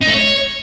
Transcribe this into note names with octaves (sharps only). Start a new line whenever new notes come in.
D#4
A3
C#5